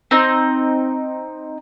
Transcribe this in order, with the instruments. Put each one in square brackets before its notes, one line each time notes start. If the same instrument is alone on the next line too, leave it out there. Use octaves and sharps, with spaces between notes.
[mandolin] C4 D#4